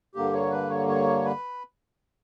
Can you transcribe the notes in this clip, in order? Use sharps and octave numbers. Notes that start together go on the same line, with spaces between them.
G2 D3 A#3 G4
C#5
B4
C#5
C#5
B4